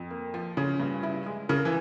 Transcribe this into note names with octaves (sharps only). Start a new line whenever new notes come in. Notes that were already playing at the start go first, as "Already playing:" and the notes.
Already playing: F2
A#3
F3
C#3 C#4
G2
E4
G#3
C#3 A#4
E3